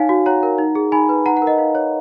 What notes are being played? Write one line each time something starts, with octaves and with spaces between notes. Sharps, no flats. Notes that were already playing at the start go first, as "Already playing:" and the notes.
Already playing: D#4 C#5 F5 G#5
F#4
C#5 F#5 A#5
A#4
D#4
G#4
D#4 G#5 B5
B4
D#4 F#5 A#5
F#5 A#5
A#4
D#5 F#5
D#4 F5
C#5